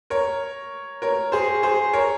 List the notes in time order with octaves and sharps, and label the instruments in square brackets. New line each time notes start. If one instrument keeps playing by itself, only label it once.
[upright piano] A#4 C#5
A#4 C#5
G#4 C5
G#4 C5
A#4 C#5